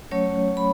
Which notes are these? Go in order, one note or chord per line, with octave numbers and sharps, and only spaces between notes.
F#3 A3 C#4 C#5
B5